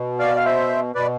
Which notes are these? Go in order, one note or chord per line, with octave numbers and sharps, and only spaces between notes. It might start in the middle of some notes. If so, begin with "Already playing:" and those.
Already playing: B2
D5 F5
F5
C5 E5
B2 B4 D5